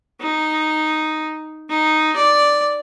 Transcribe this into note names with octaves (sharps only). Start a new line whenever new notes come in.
D#4
D#4
D5